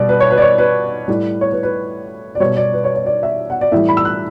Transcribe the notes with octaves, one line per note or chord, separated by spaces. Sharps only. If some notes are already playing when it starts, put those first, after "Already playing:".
Already playing: B2 G3 D5
B4
C#5
B4
D5
C#5
B4
A2 G3
C#5
B4
B4
D5
B2 G3 C#5
D5
B4
C#5
C#5
D5
E5
F#5
D5
A2 E3 G3 E5
B5
E6
F#6